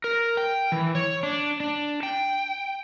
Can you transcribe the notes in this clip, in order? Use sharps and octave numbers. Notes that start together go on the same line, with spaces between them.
A#4
G5
E3
C#5
D4
D4
G5